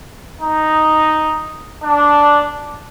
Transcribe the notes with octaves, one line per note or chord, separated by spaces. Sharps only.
D#4
D4